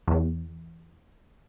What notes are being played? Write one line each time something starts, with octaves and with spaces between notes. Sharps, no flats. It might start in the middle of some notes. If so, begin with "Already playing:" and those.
E2